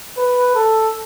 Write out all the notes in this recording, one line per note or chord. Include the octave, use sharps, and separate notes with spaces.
B4
A4